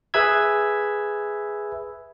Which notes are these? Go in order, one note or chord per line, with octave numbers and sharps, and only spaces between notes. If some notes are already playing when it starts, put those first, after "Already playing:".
G#4 B4 E5 B5 E6 G#6